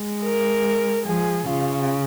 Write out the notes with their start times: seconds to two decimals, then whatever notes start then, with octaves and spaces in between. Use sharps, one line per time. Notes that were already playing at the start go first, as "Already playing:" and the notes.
Already playing: G#3
0.24 A#4
1.06 F3 G#4
1.48 C#3 F4